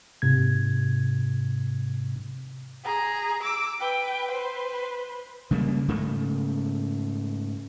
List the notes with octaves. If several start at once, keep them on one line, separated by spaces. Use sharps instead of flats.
G#2 C3 G#6
G#4 A#5
D6 E6
B4 G5
B4 C5
C#3 G3 G#3 A#3
G#2 C#3 A3